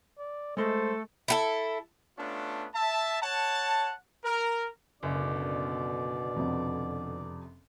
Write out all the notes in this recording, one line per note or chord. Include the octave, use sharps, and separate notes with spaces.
D5
G#3 A3 A4 C5 C6
E4 G4 A4
A3 B3 C#4 D4 F4
E5 A5
C#5 F#5 A5
A#4
F#1 F#2 B2 D3 D5
F2 C3